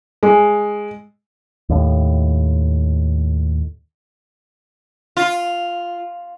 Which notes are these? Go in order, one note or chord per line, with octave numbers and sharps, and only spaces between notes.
G#3
D#2 A2
F4